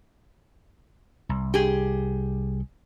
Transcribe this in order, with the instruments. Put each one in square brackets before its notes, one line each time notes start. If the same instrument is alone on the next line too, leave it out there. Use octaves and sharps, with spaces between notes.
[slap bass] C2
[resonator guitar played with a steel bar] G4 G#4